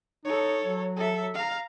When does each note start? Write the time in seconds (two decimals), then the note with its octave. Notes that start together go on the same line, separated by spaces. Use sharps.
0.25 D#4 A4 C#5
0.64 F#3
0.96 A4 E5
1.34 F5 A#5